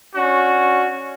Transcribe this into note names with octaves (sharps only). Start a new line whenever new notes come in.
C#4 D4 F#4